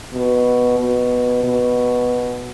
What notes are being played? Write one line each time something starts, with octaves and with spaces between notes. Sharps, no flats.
B2
B2
B2